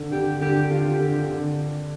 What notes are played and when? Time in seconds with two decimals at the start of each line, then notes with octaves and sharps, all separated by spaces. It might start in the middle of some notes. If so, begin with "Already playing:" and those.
Already playing: D3
0.12 D3 G4
0.41 D3 G4
0.71 D3 F4
0.93 G4
1.00 D3
1.30 D3